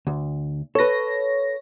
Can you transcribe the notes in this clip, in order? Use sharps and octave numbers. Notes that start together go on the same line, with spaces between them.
D2
A4 B4 C#5 A#6